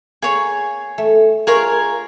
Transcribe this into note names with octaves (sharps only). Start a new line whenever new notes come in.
A#3 G#4 C#5
A3
F4 G#4 A#4 C#5